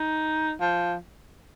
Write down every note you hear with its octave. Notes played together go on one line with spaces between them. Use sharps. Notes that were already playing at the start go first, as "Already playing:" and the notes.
Already playing: D#4
F3